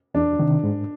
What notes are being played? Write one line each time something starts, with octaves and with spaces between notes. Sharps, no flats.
E2 D4
C3 D#3
G#2